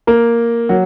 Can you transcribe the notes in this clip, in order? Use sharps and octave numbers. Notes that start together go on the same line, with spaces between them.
A#3 A#4
F#3 F#4